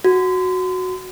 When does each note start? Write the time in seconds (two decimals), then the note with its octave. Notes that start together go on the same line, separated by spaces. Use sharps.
0.04 F#4